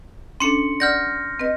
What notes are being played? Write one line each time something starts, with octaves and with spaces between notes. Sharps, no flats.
C#4 D4 A4 C6 C#7
D5 F#5 F6 G6 A#6
C4 B4 D#5